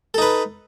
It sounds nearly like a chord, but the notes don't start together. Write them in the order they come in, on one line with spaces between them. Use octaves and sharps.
A4 D#4 B4